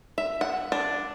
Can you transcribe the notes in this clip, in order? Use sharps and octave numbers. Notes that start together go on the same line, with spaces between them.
E5
F#5
D4